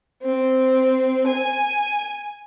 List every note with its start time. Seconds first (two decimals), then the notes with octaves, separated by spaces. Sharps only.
0.23 C4
1.27 G#5